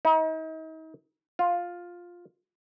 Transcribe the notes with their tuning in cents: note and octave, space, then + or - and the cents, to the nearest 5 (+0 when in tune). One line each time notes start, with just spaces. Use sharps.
D#4 +40
F4 +10